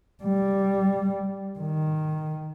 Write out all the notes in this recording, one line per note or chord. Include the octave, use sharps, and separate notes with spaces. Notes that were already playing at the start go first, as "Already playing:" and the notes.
G3
D#3